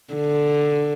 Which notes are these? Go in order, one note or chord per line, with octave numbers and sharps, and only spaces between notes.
D3